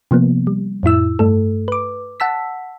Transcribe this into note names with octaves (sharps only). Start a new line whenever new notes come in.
C3 F3 A#3 B3
G3
F2 A2 E4 E6
G2 A3 A4
B4 D6
F#5 A5 E6 B6